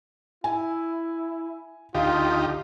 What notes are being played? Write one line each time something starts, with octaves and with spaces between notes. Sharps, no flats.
E4 G#5
D2 D#4 F4 G4 F5 C6